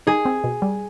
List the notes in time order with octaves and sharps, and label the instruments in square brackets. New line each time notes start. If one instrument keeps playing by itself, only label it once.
[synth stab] D#4 [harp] G#4
[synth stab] C4
B2
G3